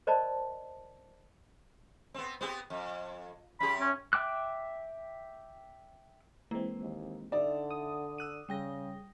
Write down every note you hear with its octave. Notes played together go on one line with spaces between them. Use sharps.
A#4 C5 D5 D#5 A5 B5
B3 C4
B3 C4 G4
F2
F#2 G4 B5
C#4
E5 G5 D6 F#6
E3 G#3 A#3 C4
D#2
D3 D#4 D5 E5
D#6
E6 F#6 D#7
C#3 G3 G5 A#6